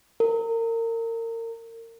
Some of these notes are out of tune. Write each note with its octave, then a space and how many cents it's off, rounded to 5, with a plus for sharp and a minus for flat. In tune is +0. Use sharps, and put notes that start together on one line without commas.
A#4 -30